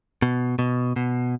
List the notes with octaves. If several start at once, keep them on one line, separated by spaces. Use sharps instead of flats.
B2
B2
B2